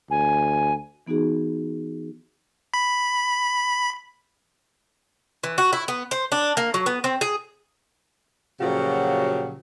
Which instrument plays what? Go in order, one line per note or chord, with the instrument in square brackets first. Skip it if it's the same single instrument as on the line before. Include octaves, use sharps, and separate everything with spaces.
[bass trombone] D2 [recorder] G#5
[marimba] E3 B3 D#4 F#4 G#4
[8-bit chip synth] B5
[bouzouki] E3
F#4
E4
B3
C5
D4
A#3
F#3
B3
C4
G#4
[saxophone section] A#2 C#3 F3 F#3 F#4 G4